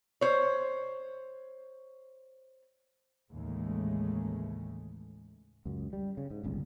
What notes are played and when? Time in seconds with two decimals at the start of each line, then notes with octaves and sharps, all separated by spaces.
0.21 C5 C#5
3.31 A1 D#2 C#3 E3 G#3 A3
5.65 C#2 F#2
5.93 G3
6.17 C#3
6.30 G#2
6.43 D1 G1 C#2